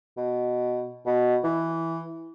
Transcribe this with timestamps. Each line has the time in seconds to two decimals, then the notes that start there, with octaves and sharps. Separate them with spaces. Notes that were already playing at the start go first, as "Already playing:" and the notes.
0.17 B2
1.06 B2
1.44 E3